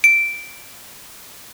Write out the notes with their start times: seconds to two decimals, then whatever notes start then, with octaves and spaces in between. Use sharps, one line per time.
0.04 D7